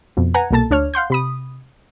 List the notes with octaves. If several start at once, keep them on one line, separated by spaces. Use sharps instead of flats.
F2 B2
B4 F#5 G#5 A#5
C2 B2 A#3 A4 A5 A6
D2 D4 C#5 F6
F5 F#5 C6 G6
C3 B5 D#6